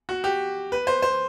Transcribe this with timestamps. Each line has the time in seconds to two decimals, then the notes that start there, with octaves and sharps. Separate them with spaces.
0.09 F#4
0.24 G4
0.72 B4
0.87 C5
1.02 C5